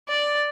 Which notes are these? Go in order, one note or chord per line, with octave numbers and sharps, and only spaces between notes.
D5